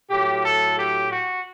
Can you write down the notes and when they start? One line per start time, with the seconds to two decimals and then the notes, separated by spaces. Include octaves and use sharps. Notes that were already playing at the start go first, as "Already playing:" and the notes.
0.10 A2 F#3 G4
0.44 A4
0.78 G4
1.10 F#4